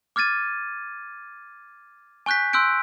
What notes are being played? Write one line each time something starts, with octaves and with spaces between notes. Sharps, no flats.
D6 F6 G#6 A6 D#7
G#5 C#6 F#6 G6 B6
C6 E6 F#6 G6 D7